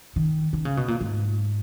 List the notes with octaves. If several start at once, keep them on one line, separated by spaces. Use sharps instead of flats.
D#3
D#3
C#3
B2
A#2
G#2